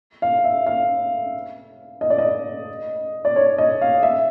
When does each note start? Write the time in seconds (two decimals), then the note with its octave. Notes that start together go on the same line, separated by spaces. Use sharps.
0.22 F5
0.44 E5
0.66 F5
2.01 D#5
2.10 D5
2.18 D#5
3.25 D5
3.36 C#5
3.58 D#5
3.81 F5
4.03 E5